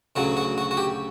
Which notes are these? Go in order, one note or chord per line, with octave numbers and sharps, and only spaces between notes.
D2 C#3 F#3 F#4
F#4
F#4
F#4
G4